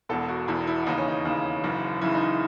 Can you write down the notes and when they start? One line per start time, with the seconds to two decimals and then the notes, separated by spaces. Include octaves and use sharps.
0.09 E1 E2 B2 A4
0.29 F#4
0.48 E1 E2 B2 E4
0.67 E4
0.86 D#2 C#3 E3 D#4
0.97 C#4
1.08 D#4
1.25 D#2 C#3 E3
1.64 F#1 F#2 C#3 E3
2.01 F#1 F#2 C#3 E3 E4
2.15 D#4